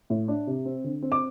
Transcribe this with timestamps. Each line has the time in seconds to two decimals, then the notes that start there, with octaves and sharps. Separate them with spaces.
0.10 A2
0.28 D4
0.47 C3
0.66 C4
0.84 D3
1.03 C4
1.12 D6